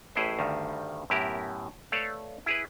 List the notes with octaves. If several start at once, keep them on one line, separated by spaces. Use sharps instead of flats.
A1 A2 E4 G#4 B4 C5
D2 G2 D#3 G3
F#2 A2 B3 E4 G4 A#4
A3 A4 B4 C#5 D5 F5
E4 G#4 B4